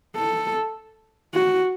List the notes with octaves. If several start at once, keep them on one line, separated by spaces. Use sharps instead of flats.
A4
F#4